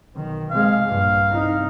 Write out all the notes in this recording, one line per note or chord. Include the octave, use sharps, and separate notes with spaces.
B1 D#3
C3 G#3 F5
A#1 G2
C2 D#4